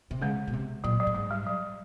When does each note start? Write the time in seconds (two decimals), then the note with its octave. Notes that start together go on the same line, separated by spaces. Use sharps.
0.11 C3
0.21 C#3 G#3
0.47 B2
0.53 C3
0.84 A#2 F#3
1.00 F#3
1.07 A2
1.14 G#2 F#3
1.31 G3
1.46 F#3